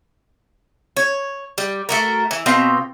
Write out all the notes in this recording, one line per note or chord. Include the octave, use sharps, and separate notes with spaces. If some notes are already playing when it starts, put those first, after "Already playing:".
C#5
G3
A3 F#4 A#4
E3
B2 C4 F4 G5